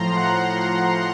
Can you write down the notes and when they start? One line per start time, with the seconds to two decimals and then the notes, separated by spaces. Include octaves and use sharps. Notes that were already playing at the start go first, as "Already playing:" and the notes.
Already playing: A2 F3 A#5 C6
0.17 F#5